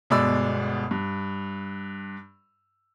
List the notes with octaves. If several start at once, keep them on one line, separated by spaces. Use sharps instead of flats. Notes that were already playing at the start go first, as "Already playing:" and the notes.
G1 B2 G#3 D5 B5 E6
G2